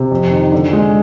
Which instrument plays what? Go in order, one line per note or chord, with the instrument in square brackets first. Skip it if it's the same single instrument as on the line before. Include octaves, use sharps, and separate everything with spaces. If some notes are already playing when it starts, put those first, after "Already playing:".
Already playing: [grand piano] C3
F2
D#3
D3
G#3